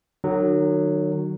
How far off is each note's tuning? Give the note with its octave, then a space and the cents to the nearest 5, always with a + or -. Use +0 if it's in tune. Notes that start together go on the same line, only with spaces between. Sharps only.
D#3 -45 F#3 +0